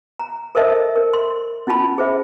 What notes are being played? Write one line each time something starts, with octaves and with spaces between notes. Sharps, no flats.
A#5
A4 A#4 C5 D#5 E5 A5
A#4
C6
C#4 E4 F4 A5 B5
G#4 C5 E5